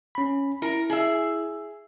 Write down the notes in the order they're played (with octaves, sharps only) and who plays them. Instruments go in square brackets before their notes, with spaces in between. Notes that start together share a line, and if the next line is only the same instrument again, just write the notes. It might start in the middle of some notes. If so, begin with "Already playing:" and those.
[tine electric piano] C#4 B5
[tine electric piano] E4 [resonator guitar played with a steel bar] A#4
[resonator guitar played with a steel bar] G#4 E5